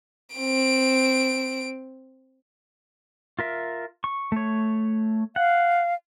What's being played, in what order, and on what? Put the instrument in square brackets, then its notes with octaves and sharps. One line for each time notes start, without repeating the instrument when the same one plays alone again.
[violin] C4 D7
[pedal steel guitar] F4 A#4 E5
C#6
A3 C#5
[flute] F5 [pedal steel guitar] F#5